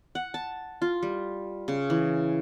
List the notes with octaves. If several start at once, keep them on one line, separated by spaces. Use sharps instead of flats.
F#5
A5
F4
G3
C#3
E3